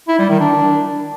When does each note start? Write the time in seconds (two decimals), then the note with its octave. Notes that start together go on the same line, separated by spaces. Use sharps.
0.08 E4
0.19 G3
0.29 D#3
0.40 D4